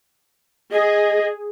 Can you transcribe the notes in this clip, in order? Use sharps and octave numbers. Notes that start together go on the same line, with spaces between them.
G#4 D#5